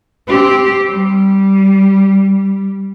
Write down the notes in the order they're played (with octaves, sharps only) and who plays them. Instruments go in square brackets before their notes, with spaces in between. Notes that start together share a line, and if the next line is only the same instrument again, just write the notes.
[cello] C4 G4
G3